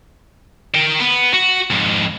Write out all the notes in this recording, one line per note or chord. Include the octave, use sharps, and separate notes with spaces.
A#4 G5
B3
F#4
F2 G#2